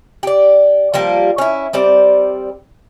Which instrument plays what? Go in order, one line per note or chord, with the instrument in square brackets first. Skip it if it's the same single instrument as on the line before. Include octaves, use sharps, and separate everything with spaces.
[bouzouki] G4 D5
F3 G3 A#3 G4
C#4 E4
G3 C4 D5